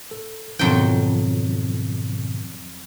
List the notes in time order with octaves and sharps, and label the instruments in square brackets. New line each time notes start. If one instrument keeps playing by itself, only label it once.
[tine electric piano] A4
[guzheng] F2 F#3 G5 [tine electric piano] G#2 B2 D#3